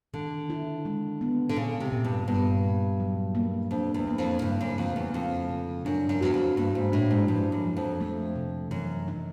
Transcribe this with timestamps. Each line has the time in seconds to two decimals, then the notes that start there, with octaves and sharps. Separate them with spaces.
0.14 D3 D#3
0.50 E4
0.85 G#3
1.21 B3
1.49 D3
1.56 A#2 C#3
1.80 C3
1.92 A#2
2.04 G2
2.28 G2 B3
2.64 A#2
3.00 F#3
3.35 A#3
3.71 F2 D4
3.94 E2
4.07 A#3
4.18 F2
4.42 G2 C#3
4.61 F#2
4.78 F2 A3
4.96 E2
5.14 F2 C4
5.50 C#3
5.85 F#2 D4
6.09 F#2
6.21 E2 F#4
6.34 F2
6.57 G2 A#3
6.75 G#2
6.92 A2 D4
7.11 G#2
7.28 G2 F3
7.52 F#2
7.64 F3
7.77 F2
8.01 A3
8.36 C3
8.71 F#2 E3
9.08 D#4